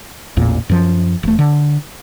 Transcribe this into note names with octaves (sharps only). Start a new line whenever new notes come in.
A1 E2 A#2
F#2 F3
E1 A3
D3